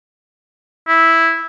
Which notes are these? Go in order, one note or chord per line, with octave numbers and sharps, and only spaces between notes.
E4